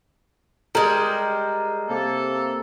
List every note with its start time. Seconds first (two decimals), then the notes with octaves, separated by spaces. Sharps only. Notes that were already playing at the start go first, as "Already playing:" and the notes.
0.75 G3 G#3 A#4
1.89 C3 A#3 A4